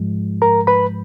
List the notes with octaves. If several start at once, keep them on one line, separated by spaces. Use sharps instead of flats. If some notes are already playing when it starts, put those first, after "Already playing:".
Already playing: G#2 F3 G#3
A#4 A#5
B4 B5